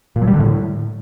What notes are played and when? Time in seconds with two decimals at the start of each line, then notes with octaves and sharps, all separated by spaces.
0.16 A#2
0.22 F#3
0.27 G3
0.33 D3
0.39 A2